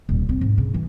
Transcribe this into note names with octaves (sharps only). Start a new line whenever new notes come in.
D#1
C4
G#2
C#3
E3